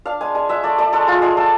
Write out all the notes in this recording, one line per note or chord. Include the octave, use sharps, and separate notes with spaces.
D4 F5
G#3 G#5
G#3 G#5
G#3 E5
A3 D5
A3 D5
G#3 A4
G#3 F4
G#3 G#4
G#3 A4